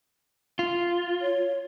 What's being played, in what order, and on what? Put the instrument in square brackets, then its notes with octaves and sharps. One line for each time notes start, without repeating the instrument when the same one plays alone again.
[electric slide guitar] F4
[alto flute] C#5